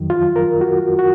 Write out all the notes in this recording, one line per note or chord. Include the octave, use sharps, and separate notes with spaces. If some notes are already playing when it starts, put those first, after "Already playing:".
Already playing: F2 D#3 F#3
F4
A#4
F#4
F#4